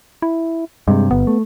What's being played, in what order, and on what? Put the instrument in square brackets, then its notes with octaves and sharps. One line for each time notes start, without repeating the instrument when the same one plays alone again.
[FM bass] E4
[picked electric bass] G2 C3 [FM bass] G#3
[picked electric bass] G1 [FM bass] B3
[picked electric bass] A3